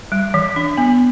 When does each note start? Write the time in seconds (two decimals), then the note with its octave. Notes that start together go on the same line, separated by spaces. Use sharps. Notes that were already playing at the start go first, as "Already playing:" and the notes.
0.12 G3
0.34 E3
0.56 D4
0.77 B3